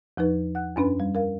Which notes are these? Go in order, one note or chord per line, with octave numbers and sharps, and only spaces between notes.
E2 F3 D#4 B4
F#5 F#6
F#2 C#4 D4 B4 B5
G3
A#4 F5